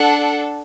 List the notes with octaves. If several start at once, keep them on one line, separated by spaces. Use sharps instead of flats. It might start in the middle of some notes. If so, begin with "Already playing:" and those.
Already playing: D4 A4 F#5